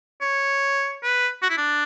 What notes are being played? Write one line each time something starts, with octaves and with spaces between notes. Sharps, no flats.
C#5
B4
F#4
E4
D4